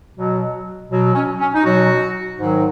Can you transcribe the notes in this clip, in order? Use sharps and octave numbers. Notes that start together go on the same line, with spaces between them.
B2 F#3
B2 F#3
C#4
C#4
D#4
B2 F#3 F#4
G#2 D#3 F#3